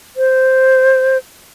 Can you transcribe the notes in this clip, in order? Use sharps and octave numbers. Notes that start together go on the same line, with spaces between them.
C5